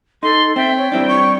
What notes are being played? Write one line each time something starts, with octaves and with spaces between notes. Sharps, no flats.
D#4 A4 C6
C4 E5 G5
C#5
G3 C4 D4 E4
C#6